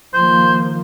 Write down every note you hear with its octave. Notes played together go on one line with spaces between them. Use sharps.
D#3 F3 A#3 C5